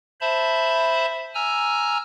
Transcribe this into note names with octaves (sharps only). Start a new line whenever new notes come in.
C5 E5 A5 B5
G#5 A#5 E6 F6